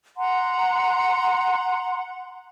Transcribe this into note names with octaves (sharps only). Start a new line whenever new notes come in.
F#5 A#5 C6